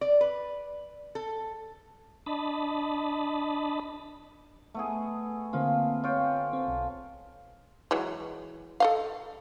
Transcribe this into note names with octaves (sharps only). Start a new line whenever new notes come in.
D5
B4
A4
D4 D#5 A5 B5
A3 B3 G#4
D3 A#3 C4 F4
F4 C#5 G5
C4
B1
E3 F#3 G#3
A4 D#5 F5